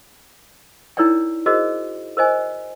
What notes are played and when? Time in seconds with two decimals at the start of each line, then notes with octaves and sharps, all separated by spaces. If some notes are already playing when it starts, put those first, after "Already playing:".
0.97 D#4 E4 A#4 C#5 D5 G5
1.46 F#4 G#4 A#4 C5 D#5
2.17 A#4 C5 D#5 G#5